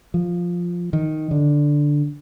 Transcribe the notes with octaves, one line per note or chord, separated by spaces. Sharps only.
F3
D#3
D3